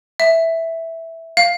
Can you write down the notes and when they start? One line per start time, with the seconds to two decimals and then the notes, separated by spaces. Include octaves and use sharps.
0.20 E5
1.37 F5